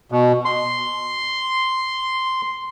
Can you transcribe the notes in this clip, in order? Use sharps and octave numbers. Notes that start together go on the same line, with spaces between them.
B2
C6